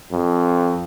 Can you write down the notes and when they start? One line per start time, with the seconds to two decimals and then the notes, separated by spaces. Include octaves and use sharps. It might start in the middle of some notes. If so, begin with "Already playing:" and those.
0.12 F2